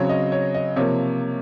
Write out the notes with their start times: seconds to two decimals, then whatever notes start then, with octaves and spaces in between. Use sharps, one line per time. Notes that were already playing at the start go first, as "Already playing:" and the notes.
Already playing: C#3 F#3 C4 C#5
0.09 D#5
0.32 C#5
0.54 D#5
0.76 C3 F3 A#3 C#5